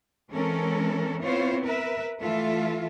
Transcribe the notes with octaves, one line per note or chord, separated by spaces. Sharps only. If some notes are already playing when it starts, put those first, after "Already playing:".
E3 G#3 C4 C#4 A4 A#4
B3 C4 E4 F4 C5 C#5
A#4 B4 E5
E3 A3 F4 A4 E5